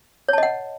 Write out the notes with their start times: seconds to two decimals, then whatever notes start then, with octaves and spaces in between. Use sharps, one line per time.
0.29 C#5
0.33 A5
0.38 D#5
0.43 F#5